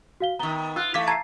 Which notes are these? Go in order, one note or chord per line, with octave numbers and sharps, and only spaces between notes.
F#4 F5 G7
D#3 B3 A#5 G7
F4 E6 F#6
E3 A3 F5 D6 G#6 B6
A5 A#5 G#6 C7